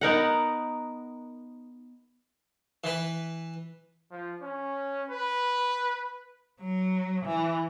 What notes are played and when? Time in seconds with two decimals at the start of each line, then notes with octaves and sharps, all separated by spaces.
0.01 B3 D#4 A#4 F#5
2.84 E3 B4
4.11 F3
4.42 C#4
5.10 B4
6.61 F#3
7.26 E3